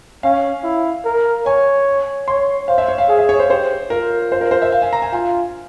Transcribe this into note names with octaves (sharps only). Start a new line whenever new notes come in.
C#4 F5
E4
A#4
C#5 G#5
C#5 C6
C5 F5
E5
C#5
F5
G#4 F5
E5
C#5
C5
G4 C5
F4 A#4
C5
A#4
C5
E5
F5
G#5
A#5
G#5
F4 G#5